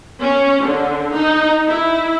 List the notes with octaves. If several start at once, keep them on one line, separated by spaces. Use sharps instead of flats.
C#4
D3
D#4
E4